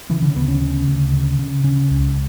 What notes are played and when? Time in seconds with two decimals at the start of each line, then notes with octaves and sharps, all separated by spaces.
0.10 C#3 E3
0.22 D3
0.30 C#4
0.35 D2 B3
0.48 C#4
0.62 C#3
0.87 D2
1.13 C#3
1.39 C#3
1.64 C#3 C#4
1.91 C#2